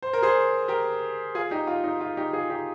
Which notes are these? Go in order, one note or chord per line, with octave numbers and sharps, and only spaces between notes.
C5
A#4
G#4 C5
G4 A#4
F4 G#4
D#4 G4
F4
D#4
F4
D#4 G4
F4 G#4
D#4 G4